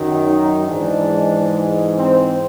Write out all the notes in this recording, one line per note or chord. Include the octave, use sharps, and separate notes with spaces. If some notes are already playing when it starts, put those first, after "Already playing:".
Already playing: F#2 D#3 F#3
D#4
G#2 E3 G#3 D4
C4